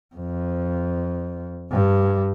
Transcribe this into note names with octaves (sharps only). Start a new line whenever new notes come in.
F2
G2